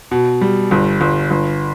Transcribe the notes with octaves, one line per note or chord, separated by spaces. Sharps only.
B2
G3
G1
G1
G1